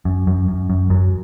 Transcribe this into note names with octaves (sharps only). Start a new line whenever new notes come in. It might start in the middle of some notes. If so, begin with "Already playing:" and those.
F#2
F#2
F#2
F#2
F#2 F#3